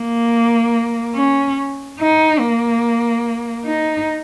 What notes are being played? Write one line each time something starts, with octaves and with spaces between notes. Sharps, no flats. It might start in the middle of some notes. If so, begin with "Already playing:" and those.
Already playing: A#3
C#4
D#4
A#3
D#4